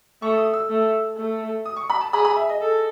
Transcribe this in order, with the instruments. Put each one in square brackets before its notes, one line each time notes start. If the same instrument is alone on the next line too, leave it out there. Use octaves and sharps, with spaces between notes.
[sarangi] A3 [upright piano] C#6
[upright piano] D#6
E6
[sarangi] A3
A3
[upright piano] D#6
C#6
B5
A5
[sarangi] G#4 [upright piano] B5
[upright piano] B5
E5
D#5
[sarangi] A4